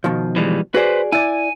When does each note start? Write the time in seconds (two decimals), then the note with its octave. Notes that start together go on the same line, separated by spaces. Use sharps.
0.04 B2 D#3 F3
0.36 E3 G3 G#3
0.74 F#4 G#4 B4 C5 D5
1.12 E4 D5 G#5